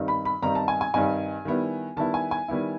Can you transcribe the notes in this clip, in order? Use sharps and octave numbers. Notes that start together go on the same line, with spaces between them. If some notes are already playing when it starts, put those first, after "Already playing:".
Already playing: G2 D#3 G3 C4 D#4
B5
B5
G2 D#3 G3 C4 D#4 A#5
A5
G#5
G#5
G2 D#3 G3 C4 D#4 G#5
D#3 G3 B3 E4
D#3 G3 B3 E4 A5
G#5
G#5
D#3 G3 B3 E4